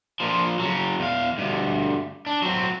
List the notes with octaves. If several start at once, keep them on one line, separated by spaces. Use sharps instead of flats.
A#2 F3
C#3 F#3
E2 F5
D2 G2
D4
F#3 C4